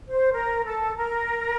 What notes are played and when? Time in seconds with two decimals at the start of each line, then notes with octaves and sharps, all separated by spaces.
0.10 C5
0.33 A#4
0.64 A4
0.95 A#4